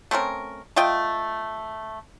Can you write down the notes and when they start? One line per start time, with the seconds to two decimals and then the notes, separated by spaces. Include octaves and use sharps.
0.11 A3 C4 C#4 A#4
0.76 A3 F4 D#5 G5